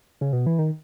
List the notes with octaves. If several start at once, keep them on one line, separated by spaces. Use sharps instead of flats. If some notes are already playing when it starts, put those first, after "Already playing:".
C#3
B2
E3
D#3